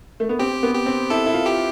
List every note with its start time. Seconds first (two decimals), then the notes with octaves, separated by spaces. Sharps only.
0.20 A3
0.29 B3
0.39 C4 G4
0.63 B3
0.74 G4
0.86 C4
1.10 E4 A4
1.26 E4
1.34 F4
1.46 G4